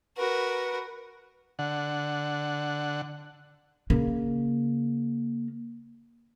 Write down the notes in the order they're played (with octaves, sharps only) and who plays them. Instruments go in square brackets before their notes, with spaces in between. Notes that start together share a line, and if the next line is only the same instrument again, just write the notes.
[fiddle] F#4 A#4 [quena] B4
[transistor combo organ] D3 F#5
[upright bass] C#3 A#3